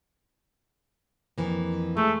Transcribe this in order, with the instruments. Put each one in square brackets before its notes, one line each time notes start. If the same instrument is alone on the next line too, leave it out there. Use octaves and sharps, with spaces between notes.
[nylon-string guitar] F2 E3 A#3
[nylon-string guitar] G#3 [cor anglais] A3